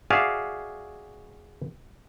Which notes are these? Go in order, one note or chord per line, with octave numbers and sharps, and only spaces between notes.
F#4 G#4 D5 E5 F5